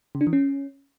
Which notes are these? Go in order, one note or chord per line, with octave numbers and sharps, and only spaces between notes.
C#3
D4
E3
C#4